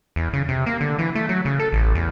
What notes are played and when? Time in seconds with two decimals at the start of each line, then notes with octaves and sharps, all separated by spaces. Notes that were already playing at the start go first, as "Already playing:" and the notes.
0.16 E2
0.33 C#3
0.49 C3
0.66 A#3
0.81 D3
0.99 E3
1.15 A3
1.29 F#3
1.45 C#3
1.60 A4
1.73 A1
1.95 E2